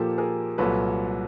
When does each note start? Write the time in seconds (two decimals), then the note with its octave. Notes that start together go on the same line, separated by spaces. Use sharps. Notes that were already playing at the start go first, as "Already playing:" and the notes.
Already playing: A#2 F3 A#3 G4 A4
0.18 G#4 A#4
0.58 C2 A#2 F#3 A4 B4